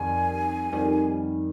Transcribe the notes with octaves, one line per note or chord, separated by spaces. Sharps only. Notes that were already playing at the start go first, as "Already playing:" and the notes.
Already playing: F2 D#3 G3 G#5
F2 D#3 G3